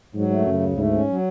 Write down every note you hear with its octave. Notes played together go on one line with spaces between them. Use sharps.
G#2 F#3
A3
F#2 C#3
D2
G#2 A3
C#4
F#3